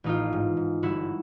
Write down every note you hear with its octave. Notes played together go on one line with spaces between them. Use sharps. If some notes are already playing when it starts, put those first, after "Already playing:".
A1 D#4 F4
G#2
G#2
G1 E4 F#4